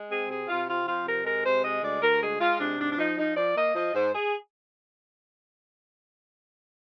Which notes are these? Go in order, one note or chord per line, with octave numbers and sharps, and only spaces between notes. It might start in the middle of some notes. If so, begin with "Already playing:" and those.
Already playing: G#3
C4 G#4
C3 G#4
C3 F4
C4 F4
F3 F4
C3 A#4
G#3 A#4
C3 C5
G#3 D#5
D2 D5
D2 A#4
G#3 G#4
G#3 F4
C3 D4
G#2 D4
D4
F3 D#4
F3 D#4
F3 D5
A#3 D#5
F3 D#5
G#2 C5
G#4